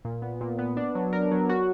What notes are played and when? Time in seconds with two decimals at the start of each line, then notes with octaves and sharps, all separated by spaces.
0.05 A#2
0.22 B3
0.41 A#2
0.59 B3
0.77 D4
0.95 F#3
1.13 A#4
1.31 F#3
1.49 F#4